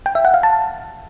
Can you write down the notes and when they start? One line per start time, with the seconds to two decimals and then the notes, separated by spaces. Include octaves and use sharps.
0.06 G5
0.15 E5
0.25 F#5
0.34 F5
0.43 A5